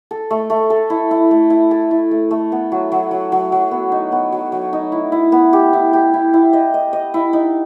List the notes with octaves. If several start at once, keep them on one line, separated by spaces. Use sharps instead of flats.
A4
A3
A3
A4
E4
E4
A3
E4
A4
E4
A3
A3
B3
F#3
F#3
F#3
F#3
F#3
B3
D#4
B3
F#3
F#3
D#4
E4
E4
B3
G4
E4
G4
E4
E4
D#5
D#5
D#5
E4
D#4